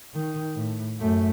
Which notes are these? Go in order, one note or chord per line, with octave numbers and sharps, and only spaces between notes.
D#3
A2
F#2 A3